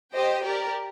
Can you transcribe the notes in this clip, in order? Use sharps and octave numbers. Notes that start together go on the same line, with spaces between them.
G4 C5 D#5 G5
G4 A#4 D5